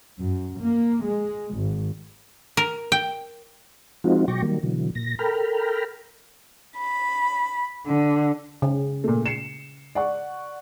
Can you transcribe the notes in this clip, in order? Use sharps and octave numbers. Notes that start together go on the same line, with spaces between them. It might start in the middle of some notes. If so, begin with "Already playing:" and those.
F#2
A#3
G#3
G#1
A#4
G5
F3 G#3 C4 D#4 F4 F#4
B2 F#3 G5 C#6 D6 A#6
D#3 F#3 G3 A#3
B2 D3 E3 F#3
A#2 A#6
A4 A#4 G5 A#5 B5 F6
B5
D3
C#3
A#2 A3
C7 C#7 E7
D5 F#5 C#6